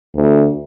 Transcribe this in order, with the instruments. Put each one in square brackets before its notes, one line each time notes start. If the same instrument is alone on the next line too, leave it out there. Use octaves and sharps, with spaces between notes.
[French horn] D2